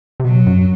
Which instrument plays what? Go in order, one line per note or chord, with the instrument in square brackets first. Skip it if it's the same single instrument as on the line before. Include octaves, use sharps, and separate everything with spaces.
[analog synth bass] C3
[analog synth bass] B2 [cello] F#3
[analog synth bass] F#2